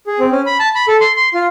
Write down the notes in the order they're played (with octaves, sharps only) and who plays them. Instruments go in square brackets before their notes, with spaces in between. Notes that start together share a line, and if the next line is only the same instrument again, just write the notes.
[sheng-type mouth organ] G#4
C4
C#4
B5
A5
B5
A4
C6
C6
F4